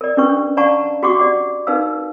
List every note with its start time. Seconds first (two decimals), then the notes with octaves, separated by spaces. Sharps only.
0.01 A#4 D5
0.17 C#4 D4 G4 B4 C#6
0.57 D5 F5 F#5 A5 A#5 C#6
1.03 F#4 G4 F#5 C#6 D6
1.19 G4 D5 F#5
1.67 D#4 A#4 B4 F5 E6